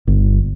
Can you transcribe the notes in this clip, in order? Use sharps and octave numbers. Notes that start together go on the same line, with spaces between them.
G1